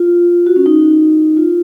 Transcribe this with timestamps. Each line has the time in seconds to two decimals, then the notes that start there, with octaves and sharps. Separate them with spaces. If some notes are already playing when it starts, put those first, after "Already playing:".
Already playing: F4
0.47 F#4
0.56 C#4
0.66 D#4
1.37 F4